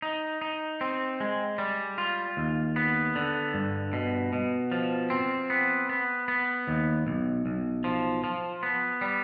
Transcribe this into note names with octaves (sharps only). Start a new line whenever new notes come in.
D#4
D#4
C4
G#3
G3
F4
D#2
B3
D3
G2
B2
B2
F3
C4
B3
B3
B3
D#2
B1
B1
F3
F3
B3
G3